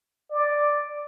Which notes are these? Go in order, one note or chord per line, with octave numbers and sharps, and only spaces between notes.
D5